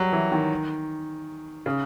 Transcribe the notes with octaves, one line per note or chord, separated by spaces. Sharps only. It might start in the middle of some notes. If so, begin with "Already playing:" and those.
Already playing: F#3 G3
E3
D#3
C#3